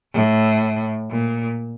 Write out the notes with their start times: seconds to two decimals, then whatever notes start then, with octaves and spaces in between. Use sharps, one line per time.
0.14 A2
1.11 A#2